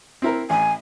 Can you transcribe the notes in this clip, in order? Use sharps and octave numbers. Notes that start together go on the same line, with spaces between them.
C4 E4 A#4
A1 G#5